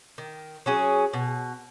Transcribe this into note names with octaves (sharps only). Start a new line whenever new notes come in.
D#3
F#3 C#4 G#4
B2